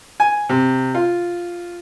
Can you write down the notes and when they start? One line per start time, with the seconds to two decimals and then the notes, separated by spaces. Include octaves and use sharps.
0.20 G#5
0.49 C3
0.94 F4